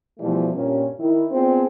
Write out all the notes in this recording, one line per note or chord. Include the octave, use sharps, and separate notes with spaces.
B2 E3 F3 G3 A3
G2 A#2 C#4
D#3 E4
B3 C4 D4 F4 G#4 C5